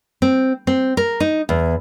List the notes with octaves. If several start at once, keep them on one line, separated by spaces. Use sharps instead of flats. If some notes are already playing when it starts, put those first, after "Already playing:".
C4
C4
A#4
D#4
E2